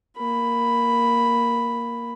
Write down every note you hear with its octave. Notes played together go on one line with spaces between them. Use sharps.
A#3 B5